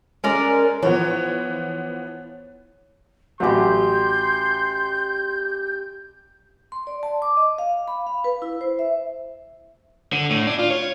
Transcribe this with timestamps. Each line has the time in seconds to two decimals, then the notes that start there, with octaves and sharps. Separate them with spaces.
0.24 G#3 C#4 A#4 D5
0.83 E3 F3 B3 C#5
3.40 A1 F#3 G4 F#5 C6 G6
6.72 C6
6.87 D5
7.03 A5
7.22 D6
7.37 D#5
7.58 F5
7.88 B5
8.07 F5
8.24 B4
8.42 E4
8.61 C5
8.79 E5
10.13 D3
10.30 A2
10.47 D4
10.59 F4
10.71 C#5